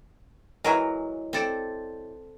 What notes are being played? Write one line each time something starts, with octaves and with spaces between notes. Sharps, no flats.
E3 F#3 G#3 A#4
C4 A4 D5